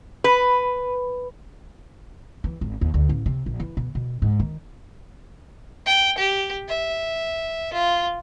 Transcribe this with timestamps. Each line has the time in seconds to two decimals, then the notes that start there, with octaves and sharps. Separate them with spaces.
0.24 B4
2.44 E3
2.61 G#1
2.81 D#2
2.94 D2
3.09 A1
3.26 C3
3.46 A#1
3.60 E3
3.77 B2
3.95 B2
4.22 G#2
4.40 D#3
5.86 G5
6.18 G4
6.68 E5
7.73 F4